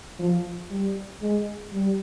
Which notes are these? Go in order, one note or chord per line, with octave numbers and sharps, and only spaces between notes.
F3
G3
G#3
G3